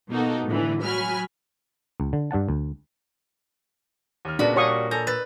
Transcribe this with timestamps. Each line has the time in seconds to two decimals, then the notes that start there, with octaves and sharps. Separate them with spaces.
0.10 B2 A#3 D#4 F#4 A4
0.46 A2 D3 E3
0.83 F#3 G#5 B5 F6
2.00 C#2
2.13 D3
2.31 G2 D4 F#5 A5
2.49 D2
4.25 D#2 F6
4.39 A#2 C#3 B3 D4 F#4 B5
4.56 G3 F#4 C#5 F5 C#6 D#6
4.91 A4 G#5 A#5 G6
5.07 B4 E6 A6